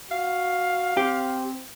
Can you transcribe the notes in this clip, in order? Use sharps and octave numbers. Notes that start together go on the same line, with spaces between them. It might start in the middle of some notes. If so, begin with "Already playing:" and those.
F#4 F5
C4 G4